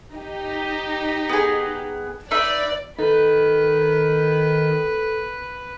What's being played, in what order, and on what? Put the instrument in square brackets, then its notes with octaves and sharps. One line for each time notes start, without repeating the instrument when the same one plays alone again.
[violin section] D#4 G4
[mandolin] B3 G#4
[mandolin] D#4 B4 E5 [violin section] D5
[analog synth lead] D#3 [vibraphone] A4 [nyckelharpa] B4